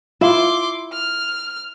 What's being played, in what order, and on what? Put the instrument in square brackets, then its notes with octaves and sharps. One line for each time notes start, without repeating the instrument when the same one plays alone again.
[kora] E4 [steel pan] F4 [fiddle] C6 D6
[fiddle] F6